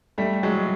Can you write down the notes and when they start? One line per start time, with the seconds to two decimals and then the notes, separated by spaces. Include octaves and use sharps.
0.18 G3 A3
0.43 F#3 G#3